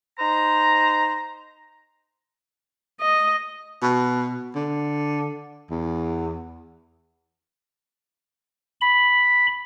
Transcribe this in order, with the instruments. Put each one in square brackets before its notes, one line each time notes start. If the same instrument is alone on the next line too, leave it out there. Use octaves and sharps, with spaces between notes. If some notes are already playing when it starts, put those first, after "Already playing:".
[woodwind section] D#4 C5 A#5
[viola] D#5
[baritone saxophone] B2
D3
E2
[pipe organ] B5